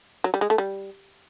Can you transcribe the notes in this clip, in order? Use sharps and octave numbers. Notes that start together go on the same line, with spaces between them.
F#3
G3
G#3
A3
G3